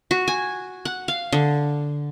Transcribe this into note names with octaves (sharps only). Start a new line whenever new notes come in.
F#4
G#5
F#5
F5
D3